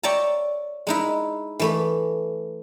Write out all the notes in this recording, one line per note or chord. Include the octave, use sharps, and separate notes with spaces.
C#5 D5 E5 G5 A5 A#5
G#3 D#4 E4
E3 A3 B5